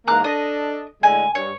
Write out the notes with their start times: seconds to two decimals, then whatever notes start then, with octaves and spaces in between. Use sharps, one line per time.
0.08 G#2 E3 A#3 A#5 D6 F#6
0.24 D4 A4 D#5
1.03 A2 D3 G#3 G#5
1.35 G2 C#5